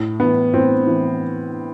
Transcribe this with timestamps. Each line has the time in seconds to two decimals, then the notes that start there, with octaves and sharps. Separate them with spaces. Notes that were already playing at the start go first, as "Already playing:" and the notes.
Already playing: A2
0.20 E3 B3
0.53 A2 C4
0.87 E3